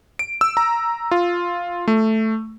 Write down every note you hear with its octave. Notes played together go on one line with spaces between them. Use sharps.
D7
E6
A#5
F4
A3